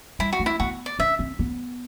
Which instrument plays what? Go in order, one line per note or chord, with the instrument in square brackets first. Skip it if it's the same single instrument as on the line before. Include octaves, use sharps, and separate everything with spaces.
[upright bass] G3 [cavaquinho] E4
[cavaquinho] F#4
[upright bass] A3
[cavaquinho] E4
[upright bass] B3 [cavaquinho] F#4
[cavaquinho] D5
[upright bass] D4 [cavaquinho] E5
[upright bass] C4
B3